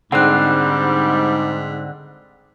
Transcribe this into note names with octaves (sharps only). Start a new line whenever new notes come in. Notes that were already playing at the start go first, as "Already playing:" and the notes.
G#2 D3 G3 C4 F#5 F#6